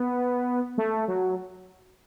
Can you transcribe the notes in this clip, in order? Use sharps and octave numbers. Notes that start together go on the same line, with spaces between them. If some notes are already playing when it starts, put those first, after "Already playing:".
Already playing: B3
A3
F#3